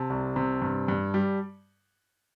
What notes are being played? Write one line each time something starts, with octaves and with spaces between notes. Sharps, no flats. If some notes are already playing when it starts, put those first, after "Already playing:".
Already playing: C3 A5
C2
C3
G2
G2
G3